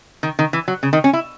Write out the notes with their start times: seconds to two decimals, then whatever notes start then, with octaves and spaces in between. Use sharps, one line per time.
0.23 D#3
0.39 D#3
0.53 E3
0.68 F#3
0.83 C#3
0.93 D#3
1.04 C#4
1.13 E4